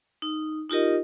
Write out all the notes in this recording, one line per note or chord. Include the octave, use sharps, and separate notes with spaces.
D#4
D#4 F4 G4 A#4 D#5